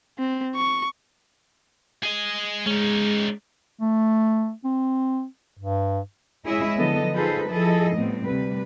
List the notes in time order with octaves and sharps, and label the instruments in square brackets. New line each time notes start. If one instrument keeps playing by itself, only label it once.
[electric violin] C4
C#6
[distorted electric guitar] G#4 D#5
[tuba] G#3 [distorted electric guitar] C#4 D#4
[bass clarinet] A3
C4
G2
[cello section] G#3 E4 G#4 C#5 D#5 E5
D3 F3 F#3 B3 A4 D#5
D#4 F4 G#4 A4 B4 C5
F3 E4 G#4 A4 D#5
A2 G3 B3 C4
D2 C3 G3 B4